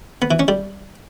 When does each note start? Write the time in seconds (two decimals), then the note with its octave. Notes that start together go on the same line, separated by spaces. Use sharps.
0.22 B3
0.31 E3
0.39 C#4
0.48 G3